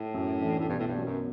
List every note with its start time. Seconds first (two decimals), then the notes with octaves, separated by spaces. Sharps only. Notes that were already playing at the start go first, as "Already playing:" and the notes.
Already playing: A2
0.14 F#2
0.41 E3 A3 D4
0.60 A2
0.68 B1 G2
0.80 A2
0.87 G2
0.96 B2 F#3 C#4
1.05 F#2